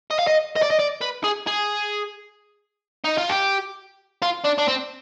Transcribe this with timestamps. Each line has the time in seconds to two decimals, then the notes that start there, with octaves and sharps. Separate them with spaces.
0.11 D#5
0.19 F5
0.27 D#5
0.56 D#5
0.63 D5
0.71 D#5
0.80 D5
1.02 B4
1.24 G#4
1.47 G#4
3.05 D#4
3.18 F4
3.30 G4
4.22 F4
4.44 D4
4.58 D4
4.68 C4